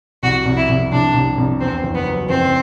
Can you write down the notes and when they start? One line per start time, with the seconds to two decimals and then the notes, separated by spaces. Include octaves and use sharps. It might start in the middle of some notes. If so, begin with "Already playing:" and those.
0.23 C2 F#4
0.45 C2
0.57 E4
0.69 C2
0.91 C2 D4
1.14 C2
1.38 C2
1.60 E2 C4
1.83 F#1
1.95 B3
2.06 F#3
2.29 F#1 C4